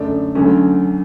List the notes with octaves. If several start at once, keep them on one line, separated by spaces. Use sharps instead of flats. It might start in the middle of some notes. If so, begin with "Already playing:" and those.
Already playing: F#2 D3 A3 D5
D2 D3 F#3 A3 C#4